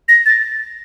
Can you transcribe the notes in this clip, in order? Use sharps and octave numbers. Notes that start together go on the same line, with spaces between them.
A#6
A6